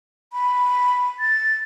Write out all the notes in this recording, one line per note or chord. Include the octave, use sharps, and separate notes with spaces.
B5
A6